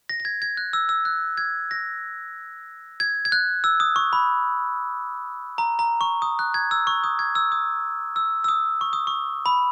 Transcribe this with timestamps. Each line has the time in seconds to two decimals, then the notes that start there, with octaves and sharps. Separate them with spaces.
0.09 A#6
0.20 A#6
0.25 G#6
0.42 G#6
0.57 F#6
0.73 E6
0.89 E6
1.05 F#6
1.38 G#6
1.71 A#6
3.00 G#6
3.25 G#6
3.32 F#6
3.64 E6
3.80 D#6
3.96 C#6
4.13 B5
5.58 A#5
5.79 A#5
6.01 C#6
6.22 D#6
6.39 F#6
6.54 G#6
6.71 E6
6.87 C#6
7.04 D#6
7.19 G#6
7.35 E6
7.52 D#6
8.16 E6
8.44 E6
8.48 D#6
8.81 C#6
8.93 D#6
9.07 C#6
9.46 B5